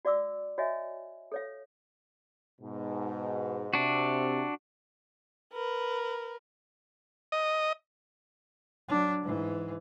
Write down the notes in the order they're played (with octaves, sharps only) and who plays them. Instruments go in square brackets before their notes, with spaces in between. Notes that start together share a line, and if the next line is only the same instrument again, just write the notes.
[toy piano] F#4 D5 F5 D6 E6
F#4 C#5 D#5 E5 G#5
A4 C#5 F5
[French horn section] G#2 B2
[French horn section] C3 [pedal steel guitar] D4 F#4
[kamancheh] A#4 B4
[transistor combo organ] D#5
[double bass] F#3 D4
G#2 E3